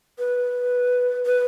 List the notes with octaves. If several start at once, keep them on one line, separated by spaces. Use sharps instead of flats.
B4
B4